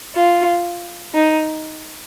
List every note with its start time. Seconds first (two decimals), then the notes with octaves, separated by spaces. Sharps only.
0.15 F4
1.13 D#4